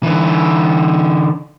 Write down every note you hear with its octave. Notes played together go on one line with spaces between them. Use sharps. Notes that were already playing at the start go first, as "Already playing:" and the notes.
D3 E3